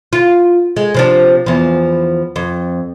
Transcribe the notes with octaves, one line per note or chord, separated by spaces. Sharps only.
F4
G#3
C3 F3 D4
E2 F3
F2